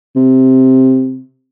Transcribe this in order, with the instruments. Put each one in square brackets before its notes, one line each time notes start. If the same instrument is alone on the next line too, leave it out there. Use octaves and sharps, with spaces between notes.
[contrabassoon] C3